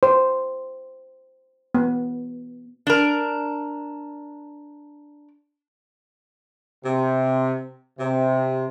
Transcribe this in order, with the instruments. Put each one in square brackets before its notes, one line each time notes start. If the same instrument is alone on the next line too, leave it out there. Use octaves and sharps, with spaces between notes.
[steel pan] C5
B3
[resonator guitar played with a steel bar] D4 A#4
[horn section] C3
C3